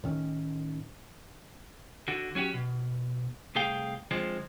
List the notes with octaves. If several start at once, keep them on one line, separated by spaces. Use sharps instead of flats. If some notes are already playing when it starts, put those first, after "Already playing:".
A2 D#3 C#4
D3 F#4
F#3 C#4 F#4 G4
B2
C2 A3 G#4 F5 G5
D3 F3 G#3 C4